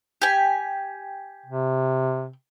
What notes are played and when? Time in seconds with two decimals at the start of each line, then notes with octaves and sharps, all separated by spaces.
0.22 G4 G#5
1.46 C3